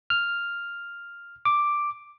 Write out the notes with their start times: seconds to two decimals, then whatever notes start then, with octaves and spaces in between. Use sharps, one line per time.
0.10 F6
1.45 D6